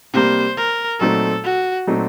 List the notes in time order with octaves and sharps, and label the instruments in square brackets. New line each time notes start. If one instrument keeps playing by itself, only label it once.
[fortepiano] C3 G3 A#3 [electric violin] C5
[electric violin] A#4
[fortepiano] A#2 F#3 A3 C4 D#4 [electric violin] A4
[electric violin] F#4
[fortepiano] A#2 F#3 A3 C4 D#4